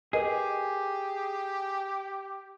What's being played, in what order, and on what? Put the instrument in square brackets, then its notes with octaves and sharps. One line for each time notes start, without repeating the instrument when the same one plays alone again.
[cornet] G4 [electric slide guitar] G#4 [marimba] A#4 B4 D#5